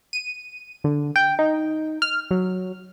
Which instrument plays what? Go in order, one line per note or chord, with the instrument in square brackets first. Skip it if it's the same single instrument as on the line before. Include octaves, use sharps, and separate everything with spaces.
[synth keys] D#7
D3
G5
D#4
F6
F#3